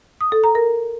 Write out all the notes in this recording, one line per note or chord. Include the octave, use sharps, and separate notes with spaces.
D#6
A4
A#5
A#4